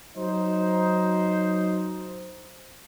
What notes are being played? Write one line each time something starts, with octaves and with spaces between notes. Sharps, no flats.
F#3 D#4 C5